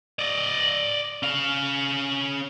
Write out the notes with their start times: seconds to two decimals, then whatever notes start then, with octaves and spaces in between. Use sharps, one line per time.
0.19 D5 D#5
1.23 C#4 F5